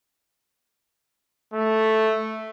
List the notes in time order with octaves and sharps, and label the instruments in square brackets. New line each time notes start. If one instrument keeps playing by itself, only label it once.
[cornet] A3